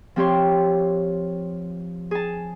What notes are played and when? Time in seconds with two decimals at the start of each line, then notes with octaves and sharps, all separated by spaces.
0.16 F3 C4 G4 C#5 C6
2.11 G#4 A5